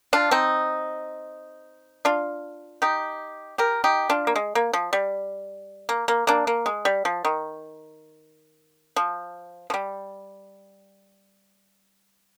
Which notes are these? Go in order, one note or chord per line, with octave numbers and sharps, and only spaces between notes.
D4 F4
C4 D#4
D4 F4
D#4 G4
G4 A#4
D#4 G4
D4 F4
A#3
G#3
A#3
F3
G3
A#3
A#3
A#3 D4
A#3
G#3
G3
F3
D#3
F3
F3
G3